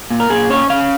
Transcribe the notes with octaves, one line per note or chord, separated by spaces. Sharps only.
A#2
A#4
A#2 G#4
C#4 C#5
C#4 F5